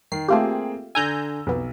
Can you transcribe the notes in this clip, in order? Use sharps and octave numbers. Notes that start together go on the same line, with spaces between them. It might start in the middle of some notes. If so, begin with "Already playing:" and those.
D#3 C7
A3 A#3 C4 F4 G4 G#4
D3 G#5 A#5 E6 G6
B1 F2 B3